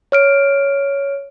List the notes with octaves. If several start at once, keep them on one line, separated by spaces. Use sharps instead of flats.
C#5 F6 D7